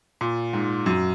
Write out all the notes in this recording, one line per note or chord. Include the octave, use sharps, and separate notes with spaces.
A#2
G#2
F#2